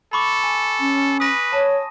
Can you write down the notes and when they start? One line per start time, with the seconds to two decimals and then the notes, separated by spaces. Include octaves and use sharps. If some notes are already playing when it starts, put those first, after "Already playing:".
0.13 A4 B5 C#6 D6
0.43 G#5
0.80 C#4
1.20 B4 D#6 A#6 D#7
1.53 C#5 A5